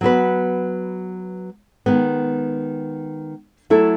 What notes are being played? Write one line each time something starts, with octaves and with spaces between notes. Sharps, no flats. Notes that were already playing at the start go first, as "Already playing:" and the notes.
F#3 B3 F#4 B4
D#3 G#3 B3
F#3 A3 E4 A4